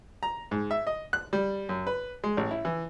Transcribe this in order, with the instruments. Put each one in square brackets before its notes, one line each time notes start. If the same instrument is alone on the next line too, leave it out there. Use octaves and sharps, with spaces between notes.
[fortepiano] A#5
G#2
E5
D#5
F#6
G3
F#2
B4
G#3
A1
E4
E3